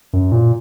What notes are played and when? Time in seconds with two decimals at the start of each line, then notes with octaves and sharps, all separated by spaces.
0.13 F#2
0.32 A#2